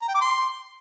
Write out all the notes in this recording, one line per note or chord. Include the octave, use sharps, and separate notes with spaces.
A#5
G5
D6
C6